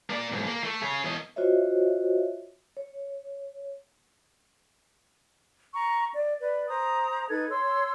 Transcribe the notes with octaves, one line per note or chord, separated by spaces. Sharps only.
A#3 D5
B1 G#2
A#3
A3
G#4 C#5
E2 D#5
F4 F#4 C5 C#5 D#5 E5
C#5
A#5 C#6
D5
B4 D5
C5 A#5 D#6
D#4 A4 B4 G#6
C#5 C6 E6